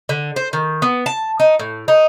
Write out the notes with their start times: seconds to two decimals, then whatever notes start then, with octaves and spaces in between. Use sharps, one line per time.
0.09 D3
0.36 C5
0.53 D#3
0.82 B3
1.06 A5
1.40 D#4
1.59 A2
1.88 D#4